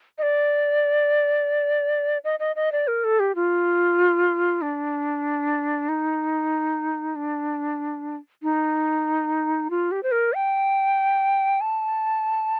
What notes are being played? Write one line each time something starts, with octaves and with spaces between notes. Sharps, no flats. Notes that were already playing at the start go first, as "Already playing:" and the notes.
D#5
D5
D#5
D#5
D#5
D5
A#4
A4
G4
F4
D4
D#4
D4
D#4
F4
G4
C5
A#4
G5
A5